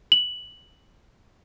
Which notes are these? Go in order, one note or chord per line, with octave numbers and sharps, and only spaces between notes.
F#7